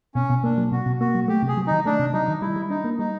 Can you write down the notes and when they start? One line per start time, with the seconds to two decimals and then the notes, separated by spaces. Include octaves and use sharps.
0.15 B2 C#4
0.30 B2
0.44 A#3 D4
0.58 F#3
0.72 B2 F#4
0.86 B2
1.00 A#3 F#4
1.15 F#3
1.28 A3 G4
1.43 C3
1.48 G#4
1.57 F#3
1.67 D#3 D#4
1.85 A3 D4
1.99 C3
2.13 F#3 D#4
2.28 D#3
2.41 G3 E4
2.56 G3
2.70 D4 D#4
2.84 A#3
2.99 G3 D#4